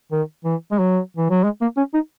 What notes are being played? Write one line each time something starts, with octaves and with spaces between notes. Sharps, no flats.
D#3
E3
G#3
F#3
E3
F#3
G#3
A#3
C#4
D#4